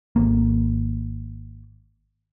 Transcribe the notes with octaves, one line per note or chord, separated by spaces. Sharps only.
G#1 A#3